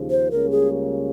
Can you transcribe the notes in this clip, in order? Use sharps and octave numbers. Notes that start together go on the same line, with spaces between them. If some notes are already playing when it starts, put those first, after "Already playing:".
Already playing: D#2 C#3 F3
C5
C#2 C#3 G3 A#3 C#4 A#4
G#4